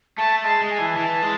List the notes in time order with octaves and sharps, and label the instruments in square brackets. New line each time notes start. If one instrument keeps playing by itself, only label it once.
[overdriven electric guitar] A3 [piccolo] A5
[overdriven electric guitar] G#3 [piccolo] A5
[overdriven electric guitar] G#3
[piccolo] G#5
[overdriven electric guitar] E3
[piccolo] G#5
[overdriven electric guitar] E3 [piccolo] A5
[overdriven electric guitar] G#3